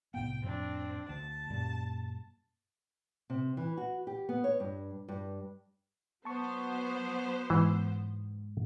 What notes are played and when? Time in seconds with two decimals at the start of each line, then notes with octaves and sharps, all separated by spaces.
0.14 C2 A2 B3 G5
0.43 F2 A2 C4 D4
1.09 D2 A5
1.50 F#2 A#2 G3
3.30 C3
3.57 E3
3.77 F#4
4.07 G4
4.29 B3
4.44 C#5
4.60 G2
5.08 G2
6.25 F#3 B3 C5 A5 C#6
7.50 G#2 E3